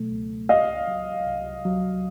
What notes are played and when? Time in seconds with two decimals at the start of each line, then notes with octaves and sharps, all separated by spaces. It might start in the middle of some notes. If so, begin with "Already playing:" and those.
Already playing: B2 F#3 A3
0.11 C#2
0.49 C2 D#5 F5
0.87 F#3
1.26 C2
1.65 F#3